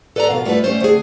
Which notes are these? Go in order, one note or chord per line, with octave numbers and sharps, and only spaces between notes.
A4 B4 D5 G#5 A#5
B2 F3 B3 A#4 F5
G3 A3 F4 G4 B4
G3 A3 C#4 C5
D3 A3 C4 G#4